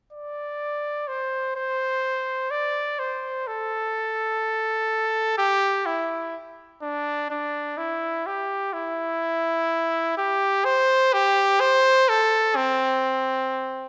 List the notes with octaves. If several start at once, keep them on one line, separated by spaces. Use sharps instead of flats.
D5
C5
C5
D5
C5
A4
G4
E4
D4
D4
E4
G4
E4
G4
C5
G4
C5
A4
C4